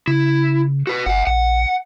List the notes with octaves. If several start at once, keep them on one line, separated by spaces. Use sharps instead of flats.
C#3 E4
F#4 B4
G1 E5 F#5
A#1 F#5